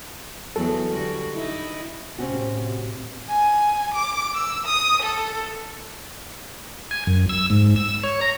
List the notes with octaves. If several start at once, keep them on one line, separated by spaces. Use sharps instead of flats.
E2 F#3 A4
D3 G3 F#4
D#4 E4
A2 C3 C4 C#4 F#4
G#5
D6
E6
D#6
A4
G#5
F#2
E6
G#2
E6
C#5
A#5